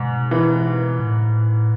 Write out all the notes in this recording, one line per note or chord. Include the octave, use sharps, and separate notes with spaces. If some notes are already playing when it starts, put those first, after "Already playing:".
Already playing: G#2 B2
E3
A2